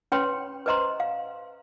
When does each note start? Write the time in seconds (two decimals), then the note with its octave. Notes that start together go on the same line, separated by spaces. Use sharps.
0.12 C#4 B4 C#5 G5 B5 C6
0.66 B4 C5 D#5 A#5 C6
1.00 F5